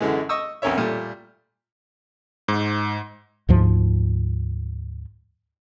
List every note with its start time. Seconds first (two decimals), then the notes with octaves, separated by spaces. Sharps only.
0.01 F#2 D3 E3 G#3
0.29 D#5 C#6 D#6 E6
0.62 B1 F2 C#4 A#4 C#5 E5
0.78 A#2 G3 A3
2.48 G#2
3.49 D2 G#2 F3